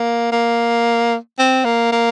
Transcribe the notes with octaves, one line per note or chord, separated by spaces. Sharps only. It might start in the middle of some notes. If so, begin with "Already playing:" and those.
Already playing: A#3
A#3
C4
A#3
A#3